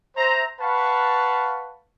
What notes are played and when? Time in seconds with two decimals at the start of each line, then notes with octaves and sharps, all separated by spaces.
0.17 C5 E5 A#5
0.60 B4 F5 F#5 A5 B5 C#6